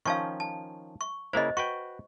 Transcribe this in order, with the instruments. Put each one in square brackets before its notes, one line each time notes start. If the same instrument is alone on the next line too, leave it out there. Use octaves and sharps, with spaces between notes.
[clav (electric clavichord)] D#3 F3 C#4 [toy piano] F5 A5 C#6
[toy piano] A5
C#6
[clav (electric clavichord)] C#3 A#3 E4 [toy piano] C5 D#5
[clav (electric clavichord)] F#4 B4 G5 [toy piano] C#6